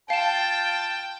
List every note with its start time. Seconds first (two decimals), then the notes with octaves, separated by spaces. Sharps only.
0.10 F4 F5 G5 A5 E7